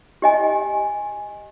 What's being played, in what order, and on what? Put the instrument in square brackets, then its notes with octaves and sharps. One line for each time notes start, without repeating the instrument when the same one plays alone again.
[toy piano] G4 D#5 G#5